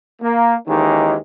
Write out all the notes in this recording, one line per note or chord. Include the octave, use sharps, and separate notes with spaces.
A#3
D#2 D#3 E3 G#3 C#4 D#4